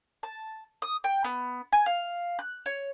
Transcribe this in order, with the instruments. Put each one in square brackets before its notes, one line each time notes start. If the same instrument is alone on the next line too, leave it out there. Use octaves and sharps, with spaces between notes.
[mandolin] A5
D#6
G5
B3
G#5
F5
F#6
C#5